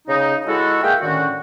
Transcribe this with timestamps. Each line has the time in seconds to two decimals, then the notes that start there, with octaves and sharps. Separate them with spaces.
0.08 C#3 D#4
0.47 G#3 E4 F#4 A4
0.84 A#3 G#4 E5 F5 G5
1.01 A2 D3 D#3 C#4 F#4